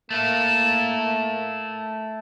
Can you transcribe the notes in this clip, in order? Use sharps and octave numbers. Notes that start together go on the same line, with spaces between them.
A3 A#3 E4